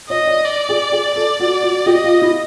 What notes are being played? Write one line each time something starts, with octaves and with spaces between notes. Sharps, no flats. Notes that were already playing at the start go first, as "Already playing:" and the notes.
C#5 D#5
D5
D5
G#4
G#4
A4 D5
F#4
F#4
G4 D#5
F4
E4